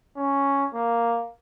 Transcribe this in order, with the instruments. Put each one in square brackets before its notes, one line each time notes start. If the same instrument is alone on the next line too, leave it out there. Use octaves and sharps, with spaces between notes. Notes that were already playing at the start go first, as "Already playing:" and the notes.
[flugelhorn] C#4
A#3